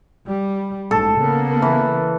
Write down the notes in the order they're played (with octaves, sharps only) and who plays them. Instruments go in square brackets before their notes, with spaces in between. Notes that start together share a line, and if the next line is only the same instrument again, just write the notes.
[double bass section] G3
[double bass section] A1 G#2 [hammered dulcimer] A4
[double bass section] C#3 A#3 B3
[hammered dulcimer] E3